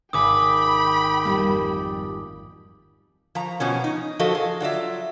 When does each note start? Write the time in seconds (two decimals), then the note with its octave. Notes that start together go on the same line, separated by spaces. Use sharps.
0.13 G#1 G5 G#5 B5 D6 D#6
1.25 F2 G3 A#3
3.35 F3 A#5
3.60 B2 F3 C#4
3.84 D#4
4.19 F3 F#4 A4 D#5
4.35 G#4
4.60 F#3 F4 D5 E5